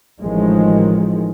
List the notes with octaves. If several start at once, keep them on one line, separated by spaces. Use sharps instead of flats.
A1 D#3 F3 G#3